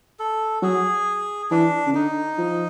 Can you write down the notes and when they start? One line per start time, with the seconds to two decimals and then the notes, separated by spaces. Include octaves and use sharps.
0.19 A4
0.62 F#3 G#4
1.51 E3 D4
1.86 C#3
1.94 D3 D#4
2.38 F3